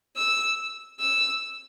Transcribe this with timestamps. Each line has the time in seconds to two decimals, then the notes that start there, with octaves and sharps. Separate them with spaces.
0.16 E6
1.00 E6